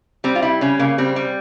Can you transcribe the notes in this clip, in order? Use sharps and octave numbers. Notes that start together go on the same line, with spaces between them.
G3 C4
F4
G3 E4
C#3 C#4
C#3 A#3
G3 C4
G3